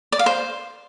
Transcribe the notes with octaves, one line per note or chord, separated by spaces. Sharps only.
D5
F5
C5